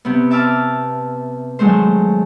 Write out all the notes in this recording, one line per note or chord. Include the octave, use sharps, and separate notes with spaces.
C3 B3
E5 A5 D6 E6 F6
D#3 F#3 G#3 A3 C5